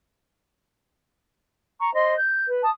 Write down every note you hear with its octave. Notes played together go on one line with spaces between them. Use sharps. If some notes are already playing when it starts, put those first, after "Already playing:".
A#5 C#6
C5 D#5 C6
G6
B4
A5 D#6